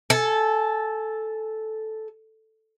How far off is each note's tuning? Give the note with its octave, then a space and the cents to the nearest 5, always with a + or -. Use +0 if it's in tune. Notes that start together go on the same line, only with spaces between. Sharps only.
A4 -5 G#5 +15